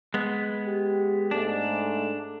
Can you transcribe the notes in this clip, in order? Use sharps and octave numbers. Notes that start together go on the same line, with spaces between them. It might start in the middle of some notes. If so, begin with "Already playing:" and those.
G#3 B3
G4
G#2 A3 D4